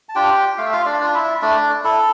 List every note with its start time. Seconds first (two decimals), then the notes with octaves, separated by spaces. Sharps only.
0.09 A5
0.15 D4 F4 G4 G5
0.58 A3 F5
0.66 E5
0.73 F4 F5
0.86 D4 D5
1.00 D4 F4
1.14 E4 E5
1.42 A3 D4 D5
1.84 E4 A4